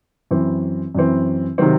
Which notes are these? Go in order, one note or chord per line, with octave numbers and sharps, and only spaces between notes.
F#2 E3 C4
F#2 E3 C4
C3 D#3 F#3 C4